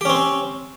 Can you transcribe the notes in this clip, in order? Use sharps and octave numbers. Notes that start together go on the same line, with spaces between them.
C4 C#4 G4